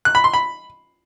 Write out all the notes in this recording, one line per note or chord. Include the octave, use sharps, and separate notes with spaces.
F#6
B5
C6
B5